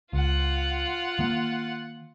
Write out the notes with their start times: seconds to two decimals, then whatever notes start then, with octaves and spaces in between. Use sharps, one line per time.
0.13 C#2 F4 F#5
1.19 D#3 A#3